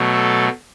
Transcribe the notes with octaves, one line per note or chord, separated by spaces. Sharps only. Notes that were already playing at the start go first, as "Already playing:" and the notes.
Already playing: B2 F#3 A3
A4